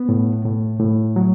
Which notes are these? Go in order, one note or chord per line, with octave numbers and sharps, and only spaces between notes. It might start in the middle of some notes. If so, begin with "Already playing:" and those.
Already playing: B3
A2
A2
A2
F#3